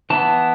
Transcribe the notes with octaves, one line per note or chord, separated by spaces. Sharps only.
E3 B3 A5